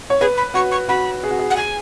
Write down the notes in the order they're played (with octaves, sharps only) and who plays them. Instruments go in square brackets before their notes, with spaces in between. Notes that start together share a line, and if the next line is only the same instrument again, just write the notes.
[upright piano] C#5
[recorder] G#4 [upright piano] B4
[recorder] B5
[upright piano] F#4 [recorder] C#6
[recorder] C#6
[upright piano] F#4 [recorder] B5
[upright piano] G#4
F#4
G#4
[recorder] F#5
[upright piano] G#4 [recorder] G#5